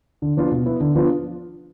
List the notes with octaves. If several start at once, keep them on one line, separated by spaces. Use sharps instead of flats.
D3
F3 B3 D4 F4
B2
B3 E4
D3
F3 B3 D4 F4